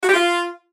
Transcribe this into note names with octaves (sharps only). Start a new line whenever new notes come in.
F#4
G4
F4